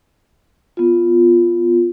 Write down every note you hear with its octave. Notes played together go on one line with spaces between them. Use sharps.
B3 F4